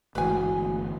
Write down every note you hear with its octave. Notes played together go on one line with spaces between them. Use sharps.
G1 D2 G#2 E3 A3 B4 F5 G#5